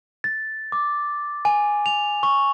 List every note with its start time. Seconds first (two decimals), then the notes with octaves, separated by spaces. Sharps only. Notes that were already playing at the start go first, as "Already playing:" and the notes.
0.24 A6
0.72 D6
1.45 G#5
1.86 F7
2.23 C#6